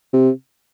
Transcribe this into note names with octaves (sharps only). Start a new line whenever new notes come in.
C3